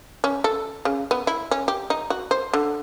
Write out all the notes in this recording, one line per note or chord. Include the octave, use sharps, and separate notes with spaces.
C#4
A4
C#3
B3
E4
C#4
G4
D#4
F#4
C5
D3